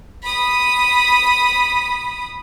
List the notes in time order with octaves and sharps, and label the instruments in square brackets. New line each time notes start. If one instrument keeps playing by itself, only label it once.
[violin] B5 D#6